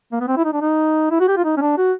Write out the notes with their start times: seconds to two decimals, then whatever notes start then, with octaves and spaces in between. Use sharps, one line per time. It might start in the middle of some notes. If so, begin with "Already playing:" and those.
0.12 A#3
0.21 B3
0.28 C4
0.37 E4
0.45 D#4
0.53 D4
0.61 D#4
1.11 E4
1.20 F#4
1.28 G4
1.37 F4
1.44 D#4
1.57 C#4
1.61 D4
1.77 F#4